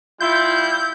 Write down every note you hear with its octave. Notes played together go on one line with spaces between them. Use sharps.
G3 E4 F4 G6